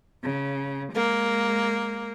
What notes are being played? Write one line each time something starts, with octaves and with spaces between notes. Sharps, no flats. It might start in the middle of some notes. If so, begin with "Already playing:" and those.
C#3
G#3 A#3